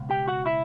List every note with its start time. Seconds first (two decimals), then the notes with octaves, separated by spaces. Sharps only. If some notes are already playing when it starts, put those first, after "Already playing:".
Already playing: C#2 B2
0.10 G4 G5
0.28 F#4 F#5
0.46 E4 E5